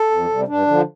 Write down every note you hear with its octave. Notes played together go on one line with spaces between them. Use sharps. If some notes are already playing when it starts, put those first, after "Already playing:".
Already playing: A4
F2
C3 G3
G2 D4
D3 F3